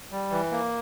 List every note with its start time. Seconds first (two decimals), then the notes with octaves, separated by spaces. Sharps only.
0.11 G3
0.31 E3
0.51 A#3